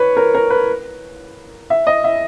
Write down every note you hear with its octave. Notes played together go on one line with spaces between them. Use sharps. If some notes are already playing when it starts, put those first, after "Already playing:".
Already playing: B4 C#5
A#4
A#4
B4
E5
D#5
E5